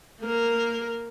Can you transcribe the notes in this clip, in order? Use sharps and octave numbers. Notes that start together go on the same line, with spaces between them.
A#3 A#4